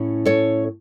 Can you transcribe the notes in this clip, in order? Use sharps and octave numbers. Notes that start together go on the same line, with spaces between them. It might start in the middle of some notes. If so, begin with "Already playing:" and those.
Already playing: A2 C#4 E4
A4 C#5